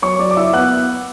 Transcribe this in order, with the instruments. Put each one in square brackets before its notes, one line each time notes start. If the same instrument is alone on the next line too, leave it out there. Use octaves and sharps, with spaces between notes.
[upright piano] F#3 C#5 C#6
F#3 D5 D6
D6
E4 E5 E6
B3 F#5 F#6